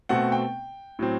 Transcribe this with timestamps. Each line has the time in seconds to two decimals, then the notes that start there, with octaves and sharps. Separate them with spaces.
0.09 B2 A3 C4 F#5
0.32 G5
0.99 A2 F#3 C4